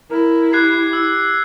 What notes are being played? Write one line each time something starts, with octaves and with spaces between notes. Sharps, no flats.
E4 A#4
G4 F#6 G#6 C7
E6